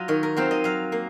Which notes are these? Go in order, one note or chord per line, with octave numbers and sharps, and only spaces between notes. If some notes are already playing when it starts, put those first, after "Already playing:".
Already playing: F#3 F4 D#5
D#3 C#5
A#4
F#3 C4 F4 C5
D#5
F#3 F5
A#3